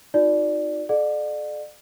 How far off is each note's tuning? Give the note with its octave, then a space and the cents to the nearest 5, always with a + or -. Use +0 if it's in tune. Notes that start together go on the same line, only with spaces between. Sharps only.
D#4 +0 F#4 -40 D5 +0
A4 -40 D5 +35 F#5 -35